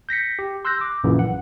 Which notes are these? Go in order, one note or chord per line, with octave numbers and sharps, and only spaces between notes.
G6 A#6 B6 C#7
G4
C6 E6 F#6 G6 A#6
D6
A#1 F#2 A#2 C#3 E3
F#5